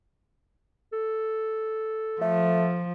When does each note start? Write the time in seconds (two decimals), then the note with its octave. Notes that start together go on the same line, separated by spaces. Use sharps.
0.93 A4
2.21 F3 A3